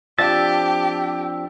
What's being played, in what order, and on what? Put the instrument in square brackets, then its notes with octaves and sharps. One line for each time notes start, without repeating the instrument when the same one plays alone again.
[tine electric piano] F3 D4 A5 [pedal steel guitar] C4 E5 [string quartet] G4 [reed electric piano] A6